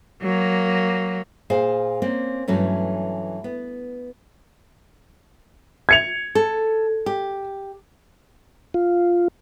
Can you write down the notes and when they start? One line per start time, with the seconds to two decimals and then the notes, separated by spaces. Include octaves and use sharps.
0.22 F#3 A#3
1.50 A#2 F4 G#4 C5 F5
2.02 A#3 C4 C#4
2.48 G2 E3 F#3 A3 C#4
3.44 B3
5.89 G#6 C#7 F7
6.35 A4
7.06 G4
8.74 F4